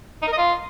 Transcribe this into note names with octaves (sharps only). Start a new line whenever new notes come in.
D#4
A#4
D#5
F4